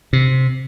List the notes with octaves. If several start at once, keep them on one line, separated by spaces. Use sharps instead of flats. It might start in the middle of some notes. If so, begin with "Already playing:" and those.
C3